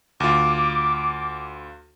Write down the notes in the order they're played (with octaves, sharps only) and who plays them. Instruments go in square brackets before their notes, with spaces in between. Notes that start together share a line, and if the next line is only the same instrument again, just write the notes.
[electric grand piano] D2 F4 [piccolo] D6